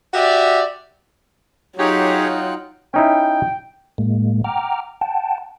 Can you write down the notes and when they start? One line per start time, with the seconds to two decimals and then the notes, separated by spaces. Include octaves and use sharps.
0.14 F#4 G4 D5 E5
1.78 F#3 D#4 F4 G4 G#4 C#5 F#5 G5
2.94 C#4 D#4 E4 G5
3.98 A2 G#3 A#3
4.44 F#5 G5 A#5 D6 F6
5.01 F#5 G5 A5